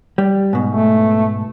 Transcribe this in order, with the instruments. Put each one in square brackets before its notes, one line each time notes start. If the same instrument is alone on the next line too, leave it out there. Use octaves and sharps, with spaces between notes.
[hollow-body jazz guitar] G3
G#2 B2
[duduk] A3